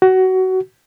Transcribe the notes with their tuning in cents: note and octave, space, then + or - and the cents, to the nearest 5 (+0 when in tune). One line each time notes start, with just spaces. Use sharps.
F#4 +20